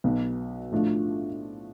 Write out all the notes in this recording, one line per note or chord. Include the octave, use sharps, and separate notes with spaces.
B1 B2 B3
A2 F3 A3 D4